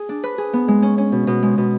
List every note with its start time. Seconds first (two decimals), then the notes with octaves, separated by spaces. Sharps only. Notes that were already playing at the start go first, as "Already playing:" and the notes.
Already playing: G#4
0.09 D4
0.24 B4
0.38 G#4
0.53 B3
0.68 G#3
0.82 C#4
0.98 C#4
1.12 B2
1.27 B2
1.43 G#3
1.58 B2